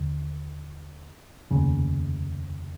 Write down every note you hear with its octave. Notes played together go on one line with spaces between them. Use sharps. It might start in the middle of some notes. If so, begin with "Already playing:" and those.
Already playing: D#2 D3
F1 D#2 C#3